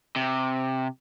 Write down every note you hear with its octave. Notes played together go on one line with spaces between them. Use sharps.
C3